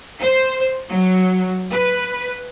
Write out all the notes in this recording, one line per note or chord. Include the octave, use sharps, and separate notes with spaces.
C5
F#3
B4